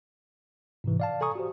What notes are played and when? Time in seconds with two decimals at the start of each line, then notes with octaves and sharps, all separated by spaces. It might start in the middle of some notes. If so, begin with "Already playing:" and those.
0.84 G#2 C3 E3
1.00 D5 F5 A5
1.21 A4 G#5 A#5 C#6 D#6
1.35 F#4 G4 C5